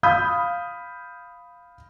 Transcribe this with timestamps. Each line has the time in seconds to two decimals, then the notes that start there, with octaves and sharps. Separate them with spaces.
0.03 F5 B5 D#6 G6